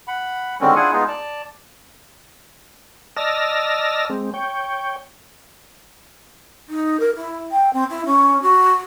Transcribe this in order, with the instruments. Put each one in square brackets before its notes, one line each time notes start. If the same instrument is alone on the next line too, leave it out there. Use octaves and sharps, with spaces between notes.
[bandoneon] F#5 B5
D3 D#3 G3 G#3 C4 C#4
D4 E4 F4 G#4 F#5 G#5
G#3 B3 D#4 F4 G#4
D5 A5
[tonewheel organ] D5 D#5 A5 E6 F6 A#6
G#3 C4
C#5 G5
[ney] D#4
A#4
E4
G5
C4
E4
C#4
F#4